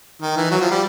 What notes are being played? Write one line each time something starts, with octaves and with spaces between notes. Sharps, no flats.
D#3
E3
F#3
F3
G3